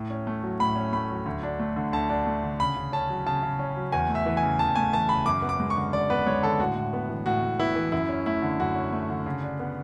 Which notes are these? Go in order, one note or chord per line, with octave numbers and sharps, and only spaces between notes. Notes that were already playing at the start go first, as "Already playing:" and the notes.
Already playing: A2
C#4
A3
F#3
A2 B5
C#4
A3 B5
F#3
D2
D4
A3
D3
D2 A5
D4
A3
D3
C#3 B5
C#3
C#4 A5
F#3
C#3 A5
C#3
C#4
F#3
E2 G#5
A3
E5
E3
G#5
C#3
E2 A5
A3 G#5
E3 A5
C#3 B5
F#2 D6
B3
D6
G#3
C#6
D3
F#2 D5
B3 B4
G#3 C#5
D3 A4
A2 F#4
A2
B3
E3
A2 F#4
A2
B3 E4
E3
F#2 E4
C#4
A3 E4
D3
F#2 F#4
C#4
A3
D3
C#3
D4
B3